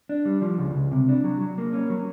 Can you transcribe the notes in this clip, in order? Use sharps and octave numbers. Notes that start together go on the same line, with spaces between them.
D4
G3
F3
C#2
C#2
C3
D4
F#3
F#3
A#3
C#4
F#3